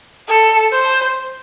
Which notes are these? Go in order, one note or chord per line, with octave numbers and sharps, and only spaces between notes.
A4
C5